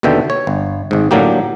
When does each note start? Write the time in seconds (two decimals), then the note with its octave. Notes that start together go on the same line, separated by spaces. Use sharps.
0.03 D#2 B2 D3 E5 G5
0.30 C#5
0.47 G1
0.91 G#1 G#2
1.11 A2 D3 F#3 A#3 G4